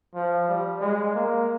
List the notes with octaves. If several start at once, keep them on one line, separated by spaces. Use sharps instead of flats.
F3
G3
G#3
A#3